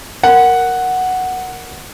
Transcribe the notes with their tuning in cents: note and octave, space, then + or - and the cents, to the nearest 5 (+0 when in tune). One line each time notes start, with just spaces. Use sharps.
A#4 +0 F#5 +0